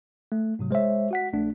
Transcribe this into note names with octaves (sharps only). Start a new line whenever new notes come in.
A3
G#2 C3 F#3
G#3 C5 C#5 E5
F#4 F#5 B6
A#1 A3 D4